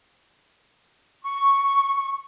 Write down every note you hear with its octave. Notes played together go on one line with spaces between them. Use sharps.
C#6